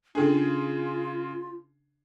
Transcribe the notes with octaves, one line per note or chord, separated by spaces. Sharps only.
C#3 D4 F4 G#4 A4 G5